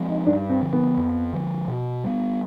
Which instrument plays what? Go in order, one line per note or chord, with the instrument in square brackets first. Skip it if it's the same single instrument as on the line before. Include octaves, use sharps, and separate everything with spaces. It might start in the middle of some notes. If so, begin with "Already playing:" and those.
Already playing: [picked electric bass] F3 G#3 C4
[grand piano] D#4
[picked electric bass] G2 [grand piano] D4
[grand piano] C4
[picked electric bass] D3 F3
[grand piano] B3
[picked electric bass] F2
D3 F3
B2
G3 B3